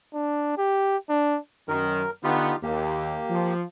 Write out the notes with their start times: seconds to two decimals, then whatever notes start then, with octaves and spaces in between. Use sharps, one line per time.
0.14 D4
0.58 G4
1.10 D4
1.68 F#2 D#3 A#4
2.24 D3 B3 D#4 F4 G4
2.63 D#2 A#3 G4
3.30 F3